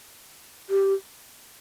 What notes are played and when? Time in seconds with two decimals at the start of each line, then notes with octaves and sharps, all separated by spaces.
0.70 G4